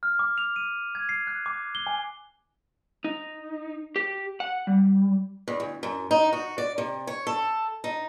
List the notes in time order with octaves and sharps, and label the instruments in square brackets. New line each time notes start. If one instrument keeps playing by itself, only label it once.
[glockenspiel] F6
D6
F7
D#7
G#6
C7
F#6
D6
G7
G#5
[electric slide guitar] D#4
G4
F#5
G3
[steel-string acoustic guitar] E2
D2
F#2
D#4
F#4
D5
C3
C#5
A4
D#4